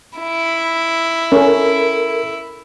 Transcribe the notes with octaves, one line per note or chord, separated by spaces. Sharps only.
E4
C#4 A4 A#4